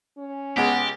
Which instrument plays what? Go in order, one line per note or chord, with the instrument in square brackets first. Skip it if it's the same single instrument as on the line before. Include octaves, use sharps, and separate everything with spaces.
[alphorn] C#4
[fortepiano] C#2 G#3 [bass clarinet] B3 [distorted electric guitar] G4